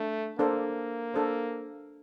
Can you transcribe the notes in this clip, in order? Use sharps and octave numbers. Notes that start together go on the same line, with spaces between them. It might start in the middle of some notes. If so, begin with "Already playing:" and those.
Already playing: A3 D4
A#3 D4 A4 C5
D4 A4 C5